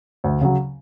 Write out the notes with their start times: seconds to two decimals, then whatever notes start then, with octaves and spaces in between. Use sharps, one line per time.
0.24 D2
0.41 C#3 F#3